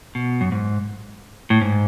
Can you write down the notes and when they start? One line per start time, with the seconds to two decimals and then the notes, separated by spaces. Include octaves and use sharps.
0.15 B2
0.41 F#2
0.52 G#2
1.50 A2
1.61 G#2